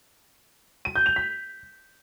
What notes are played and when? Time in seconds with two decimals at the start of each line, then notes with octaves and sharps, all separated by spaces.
0.85 D#7
0.96 G6
1.06 F7
1.16 B6